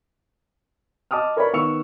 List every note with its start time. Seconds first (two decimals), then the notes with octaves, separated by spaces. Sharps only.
1.11 D#5 A5 D6 D#6 F6
1.37 A#4 B4 C#5 D5 E5 B5
1.53 D#3 B3 C#6 E6 C#7 F7